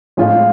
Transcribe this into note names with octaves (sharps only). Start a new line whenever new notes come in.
A2 F3 G#3 C#4 F4